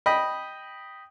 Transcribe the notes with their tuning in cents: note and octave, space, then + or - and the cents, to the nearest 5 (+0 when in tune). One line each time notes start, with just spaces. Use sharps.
D#5 +0 G5 +0 B5 -10